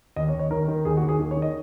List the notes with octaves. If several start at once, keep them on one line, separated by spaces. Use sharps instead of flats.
D#2 D#5
C#5
D#2
C#5
D#3 A#4
D#3
D#2 G#4
F#4
D#2
G#4
D#3
C#5
D#3
D#5